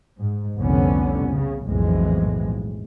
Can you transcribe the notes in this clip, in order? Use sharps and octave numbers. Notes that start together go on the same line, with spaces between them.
G#2
F1 C2 D3 B3 C#4
C#3
B1 F2 A2 E3 G#3